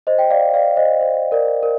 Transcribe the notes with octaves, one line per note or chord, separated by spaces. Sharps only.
C5 D#5
G5
D5 F5
D5 F5
C5 D#5
C5
A#4 D5
A#4